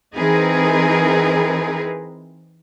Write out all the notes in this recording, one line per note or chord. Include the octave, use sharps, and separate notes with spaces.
E3 C4 D#4 G#4 A#4 B4